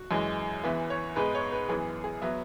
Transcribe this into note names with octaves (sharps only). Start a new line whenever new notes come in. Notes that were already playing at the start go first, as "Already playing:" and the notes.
Already playing: F#4
F#2 E3 G#3
E2 E3 B3 E5
C#5
G#2 G#3 B3 B4
C#5
B4
F#2 E3 B3 G#4
G#4
F#3 B3 E5